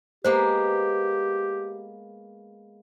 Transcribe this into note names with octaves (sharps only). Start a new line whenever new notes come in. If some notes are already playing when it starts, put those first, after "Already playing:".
G#3 A#3 B3 G4 C5